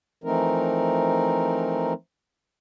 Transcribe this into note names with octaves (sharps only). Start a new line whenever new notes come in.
E3 F3 A3 C4 D#4 A#4